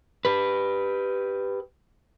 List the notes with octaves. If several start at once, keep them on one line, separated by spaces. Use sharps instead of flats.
G4 B4